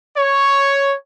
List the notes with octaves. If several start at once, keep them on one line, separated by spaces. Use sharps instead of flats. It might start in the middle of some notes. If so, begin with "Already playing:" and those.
C#5